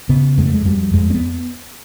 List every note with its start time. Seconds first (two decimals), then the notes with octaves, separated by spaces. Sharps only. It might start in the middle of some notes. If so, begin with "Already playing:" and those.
0.09 C#3 B3
0.38 F2 G#3
0.46 A3
0.54 G#3
0.65 F2 G3
0.94 F2 G#3
1.10 C4
1.14 B3